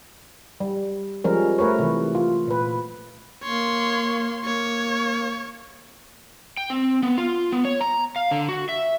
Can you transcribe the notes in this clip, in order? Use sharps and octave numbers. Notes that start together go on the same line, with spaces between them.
G3
F3 G3 G#3 C#4 A#4
A3 A#4 B4 C#5
C3 E3
F4
A#2 B4
A#3 C#5 C6
A#3 C#5
G5
C4
B3
F4
B3
C#5
A#5
F5
D3
F#4
E5